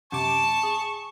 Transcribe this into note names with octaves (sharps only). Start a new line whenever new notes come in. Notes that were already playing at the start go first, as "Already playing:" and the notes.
F#2 C3 A5 C#6 D6
G#4